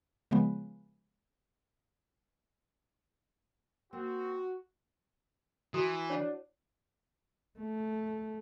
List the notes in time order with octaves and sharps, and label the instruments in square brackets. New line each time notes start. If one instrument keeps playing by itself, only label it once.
[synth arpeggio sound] C#3 F3 G#3 B3
[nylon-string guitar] A#3 [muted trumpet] C4 [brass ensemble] F#4
[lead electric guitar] E3 [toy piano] E4 F#4 D#6
[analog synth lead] D4 [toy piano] C#5 F#5
[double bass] A3